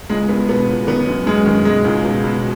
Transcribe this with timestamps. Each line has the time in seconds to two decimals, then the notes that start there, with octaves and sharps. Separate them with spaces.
0.09 C#2 G#3
0.29 C#2 B3
0.49 B2 B3
0.68 C#2
0.87 D#3 B3
1.07 F#2
1.26 F#2 G#3
1.46 D#3
1.65 B2 G#3
1.84 C#2
2.04 B2
2.24 B2